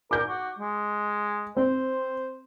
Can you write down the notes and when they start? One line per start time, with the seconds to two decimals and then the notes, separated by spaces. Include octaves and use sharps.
0.11 A#4 D6 G6
0.28 F#4
0.59 G#3
1.57 C4 C5